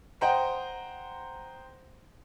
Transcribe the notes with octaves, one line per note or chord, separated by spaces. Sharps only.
C5 D#5 F#5 G5 A#5 C6